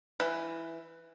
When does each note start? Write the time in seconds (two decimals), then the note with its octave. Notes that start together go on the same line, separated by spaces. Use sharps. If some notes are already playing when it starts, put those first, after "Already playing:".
0.20 E3